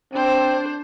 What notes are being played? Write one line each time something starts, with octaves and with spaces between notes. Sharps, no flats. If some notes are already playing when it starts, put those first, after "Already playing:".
C4 D4 C5